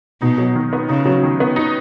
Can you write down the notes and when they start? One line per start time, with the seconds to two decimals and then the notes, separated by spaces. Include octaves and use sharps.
0.21 B2 D#4
0.38 F#3
0.55 D#3
0.73 B3
0.89 C#3 D#4
1.06 F#3
1.23 D#3
1.40 B3
1.56 D#4